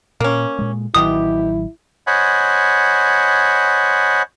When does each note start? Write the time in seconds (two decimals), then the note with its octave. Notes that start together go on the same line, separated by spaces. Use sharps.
0.20 A#2 A#3 C#4
0.59 A#2 G#3
0.95 A1 B2 D#3 F#3 E4 G4 D#6
2.07 C5 C#5 D#5 F#5 G#5 B5